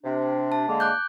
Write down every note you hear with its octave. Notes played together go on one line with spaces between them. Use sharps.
C3 D4
A5
D3 G#3 A#3
D6 F#6 G6